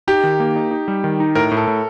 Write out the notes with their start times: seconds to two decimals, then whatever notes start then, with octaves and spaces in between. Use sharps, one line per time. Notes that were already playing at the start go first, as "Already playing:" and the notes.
0.08 D#4 G4
0.24 D#3
0.40 A#3
0.56 D#4
0.71 D#4
0.88 G3
1.04 D#3
1.20 D#4
1.35 A2 A#4
1.51 A2
1.57 A4
1.67 A2